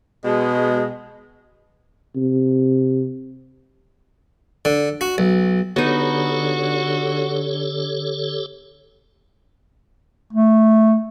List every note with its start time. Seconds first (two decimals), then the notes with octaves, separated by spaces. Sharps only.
0.24 B2 G#3
2.16 C3
4.65 D3
5.01 F#4
5.18 B1
5.76 D3 B3 D#4 F#4 G4 A4 C#5
10.33 A3